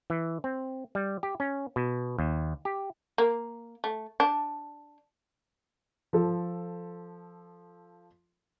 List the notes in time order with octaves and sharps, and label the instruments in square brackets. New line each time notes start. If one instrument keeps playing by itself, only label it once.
[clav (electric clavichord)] E3
C4
G3
G4
C#4
B2
D#2
G4
[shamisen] A#3
A3
D4
[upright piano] F3 A4